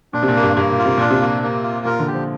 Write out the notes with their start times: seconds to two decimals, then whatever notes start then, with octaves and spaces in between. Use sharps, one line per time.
0.13 A#2 D4
0.23 C3
0.28 A#2
0.36 A#3
0.43 G2
0.57 G2 A#3
0.71 A#2
0.79 F4
0.85 C3
0.98 A#2 D4
1.11 C3
1.21 A#3
1.43 A#3
1.63 F4
1.85 A#2 A#4
1.99 D3
2.07 G4
2.14 F3